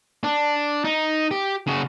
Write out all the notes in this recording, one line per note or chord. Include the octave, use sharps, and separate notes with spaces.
D4
D#4
G4
C#3 F#4